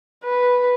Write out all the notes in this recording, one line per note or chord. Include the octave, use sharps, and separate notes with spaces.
B4